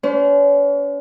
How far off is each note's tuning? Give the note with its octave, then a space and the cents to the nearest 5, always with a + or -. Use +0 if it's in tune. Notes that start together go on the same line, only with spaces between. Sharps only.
C#4 +40 C5 -35